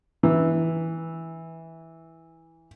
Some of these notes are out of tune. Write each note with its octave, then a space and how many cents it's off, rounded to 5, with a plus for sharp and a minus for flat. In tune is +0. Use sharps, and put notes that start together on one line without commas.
E3 -10